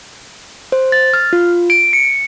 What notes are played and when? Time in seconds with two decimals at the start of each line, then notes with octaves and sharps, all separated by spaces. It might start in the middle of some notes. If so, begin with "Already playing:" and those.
0.72 C5
0.92 A6
1.14 F6
1.33 F4
1.70 D7
1.93 C#7